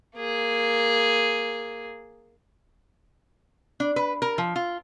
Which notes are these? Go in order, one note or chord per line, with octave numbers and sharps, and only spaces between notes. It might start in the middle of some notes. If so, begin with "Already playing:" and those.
A#3 G#4
D4
B4
A#4
F3
F4